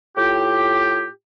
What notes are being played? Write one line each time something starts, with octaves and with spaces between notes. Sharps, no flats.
A2 F4 G4